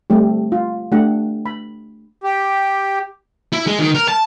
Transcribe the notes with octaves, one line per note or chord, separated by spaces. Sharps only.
G3 A3 C4 G4
F4
A3 D4 G4 F#5
B5
G4
E4
G#3
D#3
A#4
A5